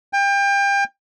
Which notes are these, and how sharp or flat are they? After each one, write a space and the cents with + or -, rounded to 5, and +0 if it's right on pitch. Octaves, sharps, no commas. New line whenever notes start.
G5 +30